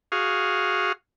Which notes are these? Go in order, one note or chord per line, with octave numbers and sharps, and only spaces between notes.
F#4 G#4 F5